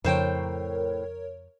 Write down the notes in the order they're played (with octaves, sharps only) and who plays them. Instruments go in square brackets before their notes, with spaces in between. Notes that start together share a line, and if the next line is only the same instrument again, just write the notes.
[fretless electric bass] F2 C#3 F3 [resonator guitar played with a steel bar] A2 C5 G5 [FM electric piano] A#4 C#5